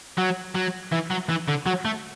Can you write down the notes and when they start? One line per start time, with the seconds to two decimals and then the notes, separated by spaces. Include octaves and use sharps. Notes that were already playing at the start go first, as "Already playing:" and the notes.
0.17 F#3
0.55 F#3
0.92 E3
1.10 F#3
1.29 E3
1.48 D3
1.66 F#3
1.85 A3